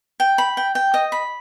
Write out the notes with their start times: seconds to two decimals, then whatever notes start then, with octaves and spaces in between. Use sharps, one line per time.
0.20 G5
0.38 B5
0.57 G5
0.75 G5
0.94 D#5
1.12 B5